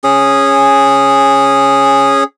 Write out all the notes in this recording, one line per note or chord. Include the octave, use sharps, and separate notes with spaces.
C#4 G#4